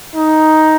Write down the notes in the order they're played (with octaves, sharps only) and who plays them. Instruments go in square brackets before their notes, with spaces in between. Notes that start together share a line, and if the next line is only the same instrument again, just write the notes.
[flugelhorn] D#4